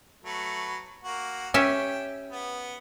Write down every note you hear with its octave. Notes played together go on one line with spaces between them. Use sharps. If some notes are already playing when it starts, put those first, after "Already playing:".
F#3 A3 B4
A#3 F#4
C#4 G4 E5 G5
B3